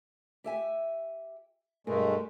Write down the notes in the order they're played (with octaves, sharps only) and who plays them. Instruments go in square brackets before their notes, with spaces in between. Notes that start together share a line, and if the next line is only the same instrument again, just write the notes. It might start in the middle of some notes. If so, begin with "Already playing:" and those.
[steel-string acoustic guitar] G4 E5 G#5
[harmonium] G2 G#3 A3 [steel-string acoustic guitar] B2 A#4 G#5